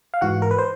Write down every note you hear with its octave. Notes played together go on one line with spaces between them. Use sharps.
F5
G#2 E3 F#4 F#5
A#4
B4
C5